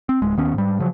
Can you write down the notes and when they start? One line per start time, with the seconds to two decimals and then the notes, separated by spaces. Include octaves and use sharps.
0.09 C4
0.22 D1 G#3
0.37 D#2 D#3 B3 C#4
0.54 G#2 G3
0.79 C#3 F3 F#3